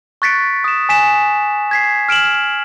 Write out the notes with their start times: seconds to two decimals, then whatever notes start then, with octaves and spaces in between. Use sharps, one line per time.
0.22 C#6 F#6 A6 B6 C#7 D7
0.64 D#6 E7
0.89 G#5 B6 E7
1.71 G#6 B6 C7
2.09 F6 D7 E7 F#7